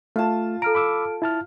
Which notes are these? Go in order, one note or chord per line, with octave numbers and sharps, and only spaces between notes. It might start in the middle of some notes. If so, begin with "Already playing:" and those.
A3 F4 A5
A4 A#5 F6 D7
B5 D6 E6
E4 A5 F6